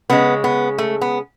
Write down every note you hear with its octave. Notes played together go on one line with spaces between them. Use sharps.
C#3 G#3 B3
B3
A3
B3